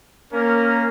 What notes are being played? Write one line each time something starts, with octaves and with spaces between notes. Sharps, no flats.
A#3 C#4 A#4